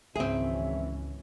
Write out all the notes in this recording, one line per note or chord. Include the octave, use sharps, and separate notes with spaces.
G#1 C#2 E3 C4 C#4 G#4 E5